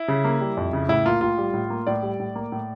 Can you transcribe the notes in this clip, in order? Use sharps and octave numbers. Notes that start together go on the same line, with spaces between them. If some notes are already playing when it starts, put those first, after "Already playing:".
Already playing: E4
C#3
A#3
G3
F2
C#3
A2 E4
A#3 F4
A2 F4
G3
A2
A#3
A2 D5
G3
A2
A#3
A2